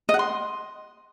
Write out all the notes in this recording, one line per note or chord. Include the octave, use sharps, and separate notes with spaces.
D#5
F#5
C6